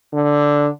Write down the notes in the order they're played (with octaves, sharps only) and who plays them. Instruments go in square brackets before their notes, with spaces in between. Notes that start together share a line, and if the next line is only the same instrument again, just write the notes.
[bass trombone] D3